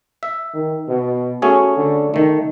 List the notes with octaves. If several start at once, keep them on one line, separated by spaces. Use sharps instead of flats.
E5
D#3
B2
A3 C#4 F#4 G#4
D3
D#3 A3 D#4